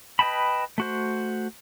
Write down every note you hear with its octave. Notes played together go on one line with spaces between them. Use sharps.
B4 D#5 G5 A5 B5
A3 F#4 C5